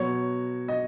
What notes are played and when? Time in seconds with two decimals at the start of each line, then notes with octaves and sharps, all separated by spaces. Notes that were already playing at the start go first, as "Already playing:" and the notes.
Already playing: B2 F#3 C#5
0.68 D#5